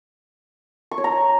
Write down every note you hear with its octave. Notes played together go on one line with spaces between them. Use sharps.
C#6
C#5
A#5